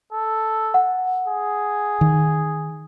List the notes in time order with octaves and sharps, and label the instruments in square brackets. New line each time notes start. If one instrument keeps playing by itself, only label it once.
[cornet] A4
[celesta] F#5
[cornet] G#4
[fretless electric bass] D#3